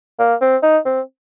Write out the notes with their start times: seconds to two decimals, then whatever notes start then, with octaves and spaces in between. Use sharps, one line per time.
0.19 A#3
0.41 C4
0.63 D#4
0.86 C4